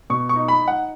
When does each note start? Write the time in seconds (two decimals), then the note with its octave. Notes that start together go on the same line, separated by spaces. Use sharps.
0.10 B2 C#6
0.29 C#6
0.36 D#4
0.48 B5
0.62 D#4
0.68 F#5